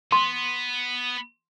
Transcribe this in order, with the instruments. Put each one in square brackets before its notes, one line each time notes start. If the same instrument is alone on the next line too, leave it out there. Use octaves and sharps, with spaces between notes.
[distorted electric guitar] B3 [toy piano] C6